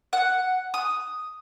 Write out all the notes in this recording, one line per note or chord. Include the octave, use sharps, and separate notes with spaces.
F#5
D#6